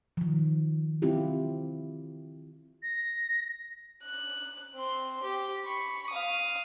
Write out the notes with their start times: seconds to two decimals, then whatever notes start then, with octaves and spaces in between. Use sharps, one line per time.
0.17 D#3 F3
1.02 C4 E4 F4 G4
2.83 A#6
4.03 F#6
4.74 C4 C6
5.23 G4
5.65 B5 C#6
6.10 F5 D#6